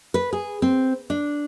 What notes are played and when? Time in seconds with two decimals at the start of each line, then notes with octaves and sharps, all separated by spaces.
0.14 B4
0.33 G#4
0.62 C4
1.10 D4